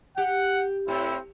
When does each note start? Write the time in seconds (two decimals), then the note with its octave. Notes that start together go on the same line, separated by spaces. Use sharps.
0.18 G4 F#5
0.88 A2 C4 E4